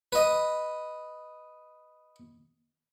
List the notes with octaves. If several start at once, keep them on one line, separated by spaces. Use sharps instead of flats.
B4 D#5